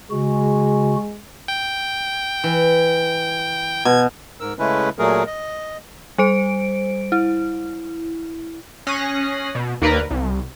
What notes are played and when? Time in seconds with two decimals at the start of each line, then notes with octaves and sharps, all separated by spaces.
0.11 C#3 G#3 F#4
1.48 G5
2.44 E3
3.85 B2 G#6
4.40 G#2 A#4 E6
4.59 C#3 G#3 A3 C#4 E4 B4
4.99 A#2 F#3 A3 G#4 A#4
5.26 D#5
6.18 G3 C5 D7
7.12 E4
8.87 C#4 D#6 F#6 A#6 C7
9.55 B2
9.82 D#2 A#3 A#4 B4 D5 A#5
10.11 C2